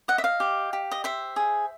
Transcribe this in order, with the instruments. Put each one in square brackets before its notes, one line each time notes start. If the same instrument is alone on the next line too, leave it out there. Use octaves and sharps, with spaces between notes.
[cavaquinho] D#5 F#5
E5
F5
G4
G4
D#5
C5 E5
G#4